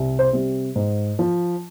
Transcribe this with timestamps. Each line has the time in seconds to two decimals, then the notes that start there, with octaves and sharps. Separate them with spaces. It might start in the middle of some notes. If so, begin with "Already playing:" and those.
Already playing: C2
0.19 C5
0.33 C3 G3
0.76 G#2
1.19 F3